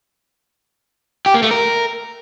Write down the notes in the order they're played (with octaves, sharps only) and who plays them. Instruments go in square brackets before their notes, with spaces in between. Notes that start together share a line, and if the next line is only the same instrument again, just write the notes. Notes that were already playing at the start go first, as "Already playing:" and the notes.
[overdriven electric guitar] G4
A#3
A3
A#4